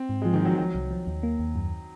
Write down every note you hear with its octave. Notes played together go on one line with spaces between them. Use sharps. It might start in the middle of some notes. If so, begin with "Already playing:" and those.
Already playing: C4
G#2
F3 G#3
D#3
F3 F#3
F3 F#3
C2
F3
D#2
A#3
D#2
F#2